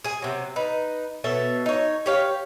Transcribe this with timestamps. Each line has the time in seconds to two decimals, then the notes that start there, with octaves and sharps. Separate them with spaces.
0.04 G#4 G#5
0.22 C3 F#3
0.56 D#4 B4
1.24 B2 A4 C#5 E5
1.66 D#4 C#5
2.06 G4 C#5 F5